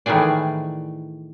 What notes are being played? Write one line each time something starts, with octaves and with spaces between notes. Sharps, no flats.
A2 D#3 E3 A3 G#4 D5